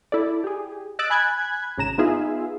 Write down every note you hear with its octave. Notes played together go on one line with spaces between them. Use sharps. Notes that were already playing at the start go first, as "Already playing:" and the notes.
E4 A4 D5
G4 G#4
D#5 E6 F#6 A6 D7
G#5 B5 F#6 G#6
G#1 C#3 A#5 E7
B3 D#4 F4 G#4 E5 F5